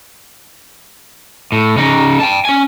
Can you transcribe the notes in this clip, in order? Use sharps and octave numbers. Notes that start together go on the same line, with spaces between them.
A2
C#3 D#4
G5 A5
C#4 G#5